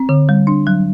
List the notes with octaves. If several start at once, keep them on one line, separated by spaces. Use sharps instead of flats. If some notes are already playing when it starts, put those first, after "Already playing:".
Already playing: C4
D3
G3
D4
F#3